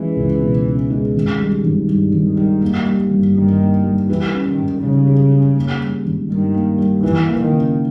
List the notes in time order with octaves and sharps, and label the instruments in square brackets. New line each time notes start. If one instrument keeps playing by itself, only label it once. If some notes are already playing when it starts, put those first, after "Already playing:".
Already playing: [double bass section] E3 [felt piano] G#3 C#4
[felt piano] C#2
B2
C#4
G#3
G#1
G3
G#1
G2
G#1
[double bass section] D#3
[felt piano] G3
A#3
G3
G1
[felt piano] G2 [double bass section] D#3
[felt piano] A#3
G3
[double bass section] E3 [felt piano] G4
[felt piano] C#4
[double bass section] D#3
[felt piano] G#2
[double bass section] C#3 [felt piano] G3
[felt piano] G4
C#4
A#3
G3
G#1
[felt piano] G2 [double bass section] D#3
[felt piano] A#3
G3
[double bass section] E3 [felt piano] E4
[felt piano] A#3
[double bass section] D#3
[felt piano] C#3